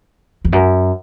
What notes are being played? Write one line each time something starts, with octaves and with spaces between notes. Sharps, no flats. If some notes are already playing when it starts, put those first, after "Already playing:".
E2
F#2